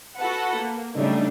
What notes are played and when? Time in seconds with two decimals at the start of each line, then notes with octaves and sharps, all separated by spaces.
0.16 F#4 A4 B4 F#5
0.57 A#3
0.96 C#3 F#3 G3 A3 D4 D#4